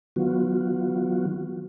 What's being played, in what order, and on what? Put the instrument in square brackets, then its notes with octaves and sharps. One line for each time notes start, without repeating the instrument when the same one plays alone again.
[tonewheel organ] D#3 F#3 B3 F4 F#4